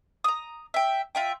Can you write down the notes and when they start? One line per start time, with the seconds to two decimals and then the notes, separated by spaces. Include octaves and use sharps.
0.24 A#5 D#6
0.74 E5 G5
1.15 F4 E5 G5